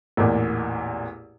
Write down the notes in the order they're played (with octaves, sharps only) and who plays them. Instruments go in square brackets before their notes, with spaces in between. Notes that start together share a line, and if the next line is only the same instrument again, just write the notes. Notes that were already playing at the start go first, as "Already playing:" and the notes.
[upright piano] A1 E2 A#2